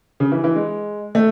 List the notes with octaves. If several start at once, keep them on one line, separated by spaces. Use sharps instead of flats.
C#3
E3
E3
G#3
A3